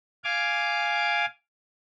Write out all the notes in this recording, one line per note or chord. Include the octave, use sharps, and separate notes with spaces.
F5 G#5 D6